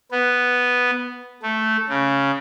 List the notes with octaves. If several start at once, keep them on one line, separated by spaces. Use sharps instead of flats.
B3
A3
C#3